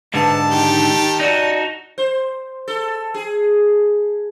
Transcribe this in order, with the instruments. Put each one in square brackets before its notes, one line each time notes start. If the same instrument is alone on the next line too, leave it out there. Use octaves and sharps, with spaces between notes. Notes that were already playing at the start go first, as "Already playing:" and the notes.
[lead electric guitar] G#2 D3 [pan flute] B4 [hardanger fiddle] A5
[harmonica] D#3 G4 [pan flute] D#4
[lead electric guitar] D#4 F#4 [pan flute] D5
[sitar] C5
A4
G#4